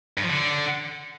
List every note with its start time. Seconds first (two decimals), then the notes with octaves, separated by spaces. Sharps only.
0.18 G2
0.24 F3
0.30 D3